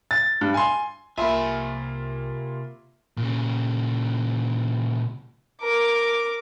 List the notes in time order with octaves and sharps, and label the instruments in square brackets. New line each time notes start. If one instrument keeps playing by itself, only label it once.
[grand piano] A6
G2
G#5 C6
[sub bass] C2 [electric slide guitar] C3 G#5 [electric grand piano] A#3 F4 [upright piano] E5 B5 C6
[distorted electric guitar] A#2 C#3
[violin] A#4 D6